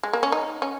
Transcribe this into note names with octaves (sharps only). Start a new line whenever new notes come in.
G#3
A#3
C#4
D#4
C#4